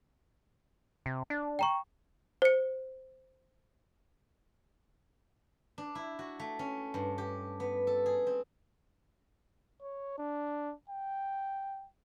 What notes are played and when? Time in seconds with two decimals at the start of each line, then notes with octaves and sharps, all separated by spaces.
1.06 C3
1.30 D4
1.59 G5 A#5 C#6
2.42 C5 C#7
5.78 D4
5.95 E4
6.19 F#4
6.40 A3
6.59 C#4
6.94 G2
7.18 G4
7.60 B3
7.87 A4
8.06 G#4
8.27 C4
9.81 C#5
10.18 D4
10.90 G5